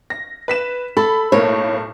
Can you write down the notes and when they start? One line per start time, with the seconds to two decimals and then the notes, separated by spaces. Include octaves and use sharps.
0.10 A#6
0.48 B4 B6 E7
0.97 A4 B5
1.32 B1 A2 A#3 C#5